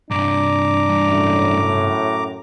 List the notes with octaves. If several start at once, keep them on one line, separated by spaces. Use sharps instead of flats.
C2 G2 D4 A#5 D6
F#2 A2